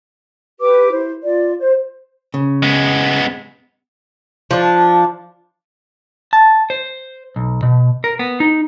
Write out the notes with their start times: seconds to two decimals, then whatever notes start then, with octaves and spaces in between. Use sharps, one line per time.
0.60 G4 B4 D6
0.91 E4 C5
1.23 F4 D5
1.59 C5
2.34 C#3
2.63 G#3 B3
4.51 F3 D4
6.33 A5
6.70 C5
7.36 B1
7.63 B2
8.04 A#4
8.19 B3
8.40 D#4